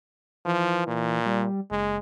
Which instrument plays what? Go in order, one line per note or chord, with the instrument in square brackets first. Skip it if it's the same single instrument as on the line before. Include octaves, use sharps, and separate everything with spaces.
[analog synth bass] E3 [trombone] F3
[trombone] A#2
[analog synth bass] G3
[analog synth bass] F#1 [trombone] G#3